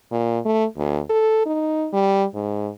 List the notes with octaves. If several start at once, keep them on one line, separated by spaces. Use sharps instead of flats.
A#2
A3
D2
A4
D#4
G3
G#2